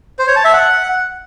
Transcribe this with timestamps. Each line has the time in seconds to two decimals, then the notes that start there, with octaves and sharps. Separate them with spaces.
0.19 C5
0.27 C#5
0.36 A5
0.45 E5
0.53 F#5